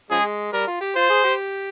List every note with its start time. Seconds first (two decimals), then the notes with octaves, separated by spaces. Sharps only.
0.11 C#3 F3 G#3 G#4
0.53 G3 A#4
0.67 F4
0.81 G4
0.95 F4 C5
1.10 G#4
1.24 G4